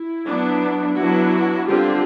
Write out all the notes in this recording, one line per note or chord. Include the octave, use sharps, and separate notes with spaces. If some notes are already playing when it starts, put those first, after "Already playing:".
Already playing: E4
F#3 B3 D4
F#3 B3 D4 E4 F#4
D3 G3 C4 F4 G4